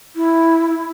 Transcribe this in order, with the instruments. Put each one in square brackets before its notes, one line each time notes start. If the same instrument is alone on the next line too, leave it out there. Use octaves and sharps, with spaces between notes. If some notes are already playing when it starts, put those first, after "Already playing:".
[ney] E4